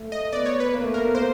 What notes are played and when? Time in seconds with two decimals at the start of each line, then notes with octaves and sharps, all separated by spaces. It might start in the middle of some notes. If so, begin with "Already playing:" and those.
Already playing: A3
0.12 D#5
0.33 B3 D5
0.46 C#5
0.60 B4
0.73 A#3
0.83 A3
0.94 A#3 A#4
1.04 B3
1.14 A#3 C5